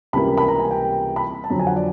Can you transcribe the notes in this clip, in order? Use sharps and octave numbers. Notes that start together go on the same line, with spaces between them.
C#2 C3 E3 G3 A#3 B5
B5
A#5
G#5
G5
B5
A5
F2 D3 F#3 A#5
G#5
F#5
D5